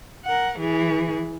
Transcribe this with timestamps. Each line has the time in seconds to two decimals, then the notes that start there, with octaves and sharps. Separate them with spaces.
0.25 A#4 F#5
0.59 E3 G#4